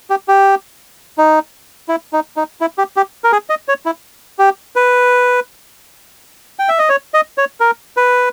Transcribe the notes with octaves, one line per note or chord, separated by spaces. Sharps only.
G4
G4
D#4
E4
D#4
D#4
E4
G4
G4
A#4
G#4
D#5
C#5
E4
G4
B4
G5
E5
D#5
C#5
D#5
C#5
A#4
B4